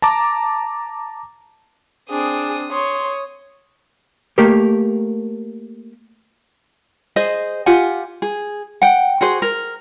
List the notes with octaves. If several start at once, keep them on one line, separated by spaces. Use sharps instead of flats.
A5 A#5 D6
C4 D4 G#4 D#6
C#5 C6 D#6
A3 A#3 G4 A#4
G#4 C5 D#5
F4 G4 F#5 G#5
G#4
F#5 G5
F#4 G#4 C5
A#4